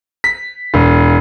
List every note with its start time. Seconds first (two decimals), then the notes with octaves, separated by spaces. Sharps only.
0.24 B6
0.74 E1